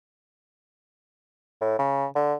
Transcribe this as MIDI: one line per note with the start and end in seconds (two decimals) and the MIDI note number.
1.61 1.77 45
1.79 2.06 49
2.15 2.34 50